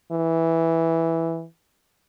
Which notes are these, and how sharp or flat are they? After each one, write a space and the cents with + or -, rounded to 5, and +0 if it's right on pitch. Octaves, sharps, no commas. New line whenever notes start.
E3 -5